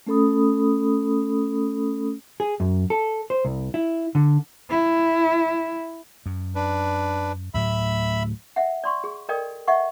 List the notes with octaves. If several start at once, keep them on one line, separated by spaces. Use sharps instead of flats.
A3 C#4 A4 B5 D#6
G#4
F#2
A4
C5
C2
E4
D3
E4
F#2
D4 B4
D2 A2 F#3 E5 B5
E5 F#5
D5 C6 C#6
G#4
A4 A#4 D5 D#5 G5
D#5 E5 F#5 C#6